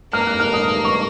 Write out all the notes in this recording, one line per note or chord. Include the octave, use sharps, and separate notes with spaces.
A#3 F6
F#6
F6
D#6
C#6